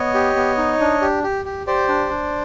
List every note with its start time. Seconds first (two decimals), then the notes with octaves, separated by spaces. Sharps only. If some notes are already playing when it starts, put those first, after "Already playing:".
Already playing: B3 C#5 D#5
0.14 G4
0.36 B3
0.57 D#4
0.80 D4
1.02 G4
1.23 G4
1.45 G4
1.66 G4 C5 D5
1.88 D4
2.10 D4